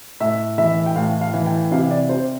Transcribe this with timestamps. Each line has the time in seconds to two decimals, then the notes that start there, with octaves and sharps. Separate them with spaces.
0.20 A2 E5
0.58 E3 E5
0.86 G5
0.96 A2 F5
1.21 F5
1.34 E3
1.46 G5
1.72 C3 F5
1.91 D5
2.09 C3 C5